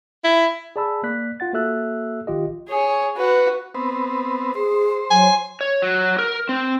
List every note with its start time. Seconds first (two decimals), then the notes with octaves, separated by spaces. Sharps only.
0.24 E4
0.76 G#4 D5 A5 B5 E6
1.03 A#3 D5 F#6 B6
1.40 F4 F#5 A6
1.53 A#3 F#4 A4 E5 E6 F#6
2.27 A#1 D#3 F4 G4 D#5
2.68 G#4 C#5
3.17 F#4 B4
3.75 B3 C4
4.55 G#4 C5
5.11 F#3 G#5
5.61 C#5
5.82 F#3
6.19 A#4
6.49 C4